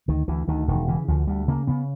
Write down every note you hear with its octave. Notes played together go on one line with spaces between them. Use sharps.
D2 D#3
D2 E3
D2 D#3
E1 D#3
C#3 E3
D2 F3
D2 G3
C#3 A#3
C#3 B3